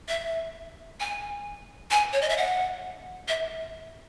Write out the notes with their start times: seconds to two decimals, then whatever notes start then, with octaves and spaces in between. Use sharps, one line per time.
0.08 E5
1.00 G#5
1.91 G#5
2.13 C#5
2.22 D#5
2.29 E5
2.37 F#5
3.28 E5